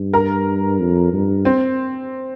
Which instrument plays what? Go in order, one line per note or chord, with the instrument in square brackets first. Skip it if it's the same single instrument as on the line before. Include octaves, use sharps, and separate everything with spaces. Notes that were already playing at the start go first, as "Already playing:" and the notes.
Already playing: [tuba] G2
[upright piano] A#4
[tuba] F2
G2
[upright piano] C4